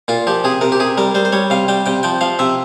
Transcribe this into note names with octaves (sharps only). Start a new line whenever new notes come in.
A#2 F4
F3 G4
C3 G#4
C3 A#4
G4
C3 G#4
G3 A#4
G3 C5
C5
G3 C#5
C3 F5
G3 G5
C3 G5
F3 G5
F3 F5
C3 E5